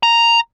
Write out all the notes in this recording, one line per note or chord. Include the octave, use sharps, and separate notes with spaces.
A#5